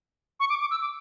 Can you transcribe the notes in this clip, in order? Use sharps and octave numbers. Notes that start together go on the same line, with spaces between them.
C#6
D6
D6
E6
D6